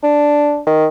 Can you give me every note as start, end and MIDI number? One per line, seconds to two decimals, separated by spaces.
0.03 0.60 62
0.66 0.87 51